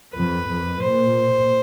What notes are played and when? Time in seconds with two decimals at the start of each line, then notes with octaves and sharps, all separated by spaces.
0.14 F2 B4
0.48 F2
0.82 A#2 C5